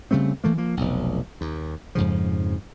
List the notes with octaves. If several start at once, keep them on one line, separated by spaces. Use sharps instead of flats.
C#3 G3 A3 C4
E3 A3 A#3
F3 A#3
F1 B1
D#2
F2 G#2 C#3 F3